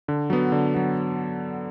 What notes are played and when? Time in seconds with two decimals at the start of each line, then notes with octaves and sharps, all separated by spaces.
0.08 D3
0.30 F#3 B3
0.52 D3
0.74 F#3 B3